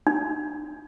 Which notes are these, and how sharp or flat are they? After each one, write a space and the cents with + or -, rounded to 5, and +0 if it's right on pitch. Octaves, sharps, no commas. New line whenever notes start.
D4 +45